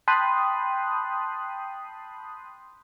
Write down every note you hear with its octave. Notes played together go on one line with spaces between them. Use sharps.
G5 A5 B5 C6 D#6 F#6